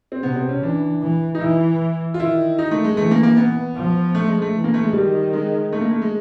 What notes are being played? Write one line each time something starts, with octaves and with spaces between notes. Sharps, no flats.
C4
C3 B3
C4
C#4
E3 D4
E3
D#4
E3 E4
F4
D#3 E4
D#4
A3
G#3
E3 A3
A#3
A#3
B3
F3
A3
G#3
A3
E3
A#3
A3
G#3
D#3 G3
G#3
A3
A#3
A3
G#3